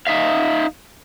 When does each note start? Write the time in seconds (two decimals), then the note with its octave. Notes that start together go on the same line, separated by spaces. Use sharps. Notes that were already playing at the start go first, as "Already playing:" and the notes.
0.07 D#4 E5 F5